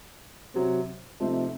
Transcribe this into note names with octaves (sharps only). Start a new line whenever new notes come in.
C3 F#3 C4
C3 F3 A3 C4 D#4